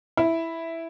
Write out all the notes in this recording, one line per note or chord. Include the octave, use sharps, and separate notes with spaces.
E4